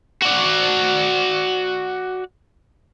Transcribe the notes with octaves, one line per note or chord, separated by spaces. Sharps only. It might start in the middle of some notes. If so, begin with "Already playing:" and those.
F#4 D5